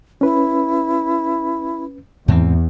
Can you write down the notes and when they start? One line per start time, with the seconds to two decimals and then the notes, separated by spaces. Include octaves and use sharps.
0.21 C#4 E4 B4
2.28 E2 G#2 C4